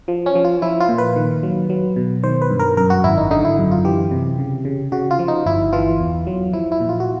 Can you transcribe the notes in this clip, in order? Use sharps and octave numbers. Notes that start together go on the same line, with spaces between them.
F3
C#4
F3
F4
F3 E4
F4
A#2
B4
D#3
F#3
F#3
B2
D#3 C5
B4
G2
A#4
F#2 A#4
F#4
G#1 E4
D#4
D3 D#4
E4
F#2
F4
E3 G4
C3
C#3
C#3
C#3 F#4
F4
F3
D#4
G1 E4
E3 F4
E2
F#3
F3 E4
E4
A#2
F4
F#4